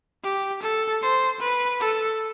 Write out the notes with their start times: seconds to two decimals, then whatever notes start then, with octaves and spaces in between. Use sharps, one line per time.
0.24 G4
0.62 A4
1.02 C5
1.40 B4
1.80 A4